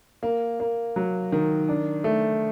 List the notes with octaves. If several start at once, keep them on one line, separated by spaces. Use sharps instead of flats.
A#3
A#3
F#3
D#3
D4
A3